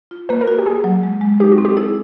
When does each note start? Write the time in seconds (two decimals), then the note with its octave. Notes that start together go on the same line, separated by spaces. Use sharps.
0.11 F4
0.29 A#3 B4
0.41 A#4
0.48 F#4
0.59 G4
0.66 A#3 G#4
0.84 F#3
1.03 G#3
1.21 G#3
1.40 D#4 G4
1.52 F#4
1.58 C4
1.65 G4
1.77 E4 G#4